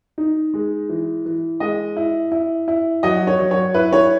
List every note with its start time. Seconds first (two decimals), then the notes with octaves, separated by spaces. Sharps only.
0.18 D#4
0.54 G#3
0.89 E3
1.26 E3
1.60 G#3 D#5
1.97 E4
2.32 E4
2.68 E4
3.03 F#3 D#5
3.27 C#5
3.39 F#3
3.51 C#5
3.74 E4 B4
3.93 C#5